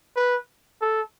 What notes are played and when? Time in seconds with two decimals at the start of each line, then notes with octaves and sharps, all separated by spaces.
0.16 B4
0.81 A4